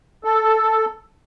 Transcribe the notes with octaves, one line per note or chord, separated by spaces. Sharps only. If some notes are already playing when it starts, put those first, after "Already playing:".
A4